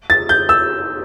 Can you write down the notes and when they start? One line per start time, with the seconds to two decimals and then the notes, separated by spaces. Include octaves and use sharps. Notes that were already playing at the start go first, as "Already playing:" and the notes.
0.10 A6
0.29 G6
0.49 E6